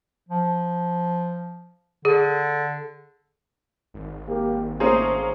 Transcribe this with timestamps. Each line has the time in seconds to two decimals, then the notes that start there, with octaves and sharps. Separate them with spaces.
0.29 F3
2.05 D3 G#4
3.94 G#1
4.28 A#3 G4
4.80 A3 A#3 C#4 G#4 C5 A#5 D#6